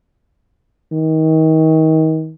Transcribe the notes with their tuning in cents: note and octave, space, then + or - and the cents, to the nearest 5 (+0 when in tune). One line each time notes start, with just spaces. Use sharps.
D#3 +30